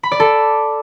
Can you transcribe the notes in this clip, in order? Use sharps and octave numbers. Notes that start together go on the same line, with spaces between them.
B5
D5
A4